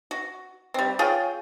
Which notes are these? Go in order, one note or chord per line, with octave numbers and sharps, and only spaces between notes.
F#4
G3 C4
F4 G#4 C#5 G5